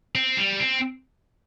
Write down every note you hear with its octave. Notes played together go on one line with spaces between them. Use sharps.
C4
G3
C4